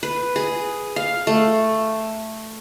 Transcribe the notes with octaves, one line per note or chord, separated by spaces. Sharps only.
B4
G#4
F5
A3